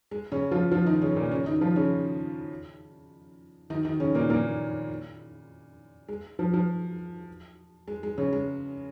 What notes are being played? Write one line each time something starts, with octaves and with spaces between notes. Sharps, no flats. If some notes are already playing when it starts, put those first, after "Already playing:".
G#3
C#3 C#4
F3 F4
F3 F4
D#3 D#4
C#3 C#4
A#2 A#3
C#3 C#4
D#3 D#4
F3 F4
C#3 C#4
D#3 D#4
D#3 D#4
C#3 C#4
A#2 A#3
A#2 A#3
G#3
F3
F3
G#3
G#3
C#3 C#4
G#3